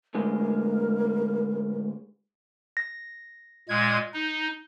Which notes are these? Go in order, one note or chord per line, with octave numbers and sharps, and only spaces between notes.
D2 A2 G#3 A#4
A#6
A#2 G#3 G#6
D#4